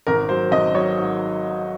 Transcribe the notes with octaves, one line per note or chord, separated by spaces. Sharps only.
G#1 A#4
F#3 C5
G#1 D#5
F#3 C#5
G#2